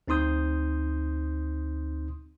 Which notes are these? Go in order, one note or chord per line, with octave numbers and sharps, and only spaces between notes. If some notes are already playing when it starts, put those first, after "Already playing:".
D2 C4 D#4 C6 D#6 G6